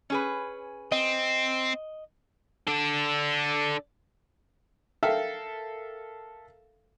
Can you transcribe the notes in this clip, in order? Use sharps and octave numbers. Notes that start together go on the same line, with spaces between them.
C#4 G#4 B4
C4 D#5
D4 A4
A4 A#4 E5 F5 G5